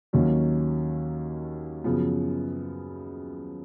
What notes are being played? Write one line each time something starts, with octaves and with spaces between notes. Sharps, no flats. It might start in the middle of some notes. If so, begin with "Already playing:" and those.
D#2 D#3 F#3 A#3 C#4
F#2 C#3 F3 B3